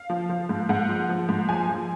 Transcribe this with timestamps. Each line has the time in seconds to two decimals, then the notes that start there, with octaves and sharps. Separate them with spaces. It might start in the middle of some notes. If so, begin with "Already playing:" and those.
Already playing: F5
0.10 F3
0.29 F3
0.49 G#2
0.69 G#2 F#5
0.89 F3
1.09 F3
1.29 G#2
1.49 F3 G#5
1.69 F3